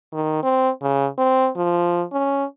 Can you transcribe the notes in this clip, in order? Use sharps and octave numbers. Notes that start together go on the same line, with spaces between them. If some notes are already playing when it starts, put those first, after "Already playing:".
D#3
C4
C#3
C4
F3
C#4